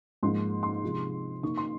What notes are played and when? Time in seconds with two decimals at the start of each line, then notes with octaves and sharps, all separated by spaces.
0.23 G#2 F3 A#3 C6
0.63 C6
0.83 C3 F3 G#3 D#4
1.43 D#3 A#3 D#4 C#6
1.58 C6